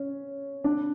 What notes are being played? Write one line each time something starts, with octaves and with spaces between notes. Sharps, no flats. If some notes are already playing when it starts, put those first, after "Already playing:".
Already playing: C#4
D4